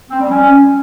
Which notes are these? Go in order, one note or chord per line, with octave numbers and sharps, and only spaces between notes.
C4
G3
C#4